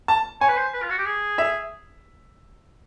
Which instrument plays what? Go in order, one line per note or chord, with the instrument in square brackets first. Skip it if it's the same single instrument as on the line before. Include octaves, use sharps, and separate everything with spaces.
[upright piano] A5
[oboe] C#5 [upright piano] G#5
[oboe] B4
C5
B4
F4
F#4
G4
G#4
[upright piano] E5